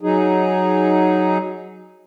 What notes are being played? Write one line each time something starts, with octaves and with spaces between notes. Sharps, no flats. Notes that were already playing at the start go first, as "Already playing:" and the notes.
F#3 D#4 G#4